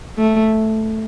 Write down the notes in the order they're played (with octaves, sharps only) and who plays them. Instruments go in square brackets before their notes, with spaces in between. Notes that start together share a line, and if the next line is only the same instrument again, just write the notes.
[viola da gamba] A3